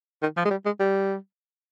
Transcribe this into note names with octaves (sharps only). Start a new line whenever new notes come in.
D#3
F3
G#3
G3
G#3
G3